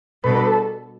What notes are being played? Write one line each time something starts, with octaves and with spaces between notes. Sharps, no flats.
B2 G3 D4 A4 B4
B4
A4